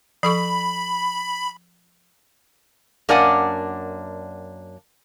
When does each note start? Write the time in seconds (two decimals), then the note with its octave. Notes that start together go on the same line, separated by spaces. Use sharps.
0.23 F3 A4 B5 C#6
3.09 F#2 A#3 D4 D5 F#5 G#5